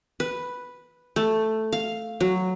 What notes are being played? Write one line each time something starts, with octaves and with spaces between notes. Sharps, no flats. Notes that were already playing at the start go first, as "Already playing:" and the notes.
B4
A3
F5
F#3